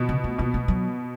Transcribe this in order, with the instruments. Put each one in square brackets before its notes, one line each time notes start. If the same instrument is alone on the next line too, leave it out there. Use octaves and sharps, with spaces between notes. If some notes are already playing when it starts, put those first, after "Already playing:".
Already playing: [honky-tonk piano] B2
[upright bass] C#3
A3
[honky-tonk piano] B2 [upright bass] B3
[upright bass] A3
F#3